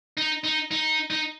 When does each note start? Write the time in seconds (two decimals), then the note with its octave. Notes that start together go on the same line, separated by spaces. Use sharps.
0.17 D#4
0.44 D#4
0.71 D#4
1.10 D#4